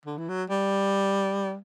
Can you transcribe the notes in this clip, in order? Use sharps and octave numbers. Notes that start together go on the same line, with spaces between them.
D3
E3
F#3
G3